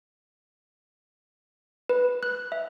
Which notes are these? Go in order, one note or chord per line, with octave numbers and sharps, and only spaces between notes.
B4
F#6
E5